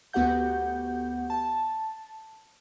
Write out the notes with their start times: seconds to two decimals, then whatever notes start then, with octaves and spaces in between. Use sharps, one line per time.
0.13 D2 B3 F#4 G4 F#5 G6
1.30 A5